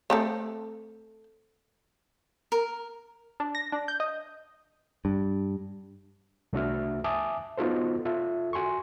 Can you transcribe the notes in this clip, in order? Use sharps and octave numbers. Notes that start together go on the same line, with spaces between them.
A3 C4 A4
A#4
D4
A#6
D4
G6
D#5
G2
C2 A3 D4 F#4 E5 F6
E5 G#5 A5 D6 D#6
B3 D#4 F4 F#4 A4 C5
F4 A4 E5
F#4 G#5 C6 C#6